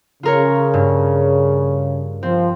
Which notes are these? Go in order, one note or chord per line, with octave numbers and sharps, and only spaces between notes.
C#3 F4 A#4 C#5
G2
F3 C4